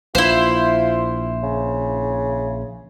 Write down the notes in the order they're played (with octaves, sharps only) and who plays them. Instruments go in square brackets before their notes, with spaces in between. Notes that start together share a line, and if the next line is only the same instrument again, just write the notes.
[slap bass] A#1 [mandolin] E4 C5 [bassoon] F4
[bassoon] C#3